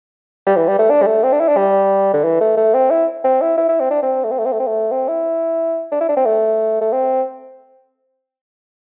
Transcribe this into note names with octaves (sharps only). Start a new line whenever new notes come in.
G3
E3
G3
A3
D4
G3
A3
C4
D4
E4
D4
G3
D3
E3
A3
A3
C4
E4
C4
E4
E4
E4
C4
D4
C4
A3
C4
A3
C4
A3
C4
A3
C4
E4
D4
E4
D4
C4
A3
A3
C4